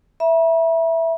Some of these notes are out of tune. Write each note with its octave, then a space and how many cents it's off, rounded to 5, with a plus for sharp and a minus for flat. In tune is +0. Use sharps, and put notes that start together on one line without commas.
E5 +0 B5 -45